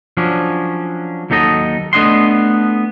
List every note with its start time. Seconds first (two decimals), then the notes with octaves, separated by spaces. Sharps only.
0.17 F3 F#3 C#4 D4
1.30 D#2 F#3 D#4 A4 D#5
1.93 A3 B3 D4 D#5 F#5 C6